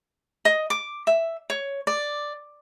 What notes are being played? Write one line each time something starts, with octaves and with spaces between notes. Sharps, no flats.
D#5
D6
E5
C#5
D5